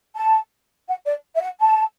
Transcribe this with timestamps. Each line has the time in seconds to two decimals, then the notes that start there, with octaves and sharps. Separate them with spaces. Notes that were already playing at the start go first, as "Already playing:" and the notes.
0.15 A5
0.88 F#5
1.06 D5
1.35 E5
1.42 F#5
1.60 A5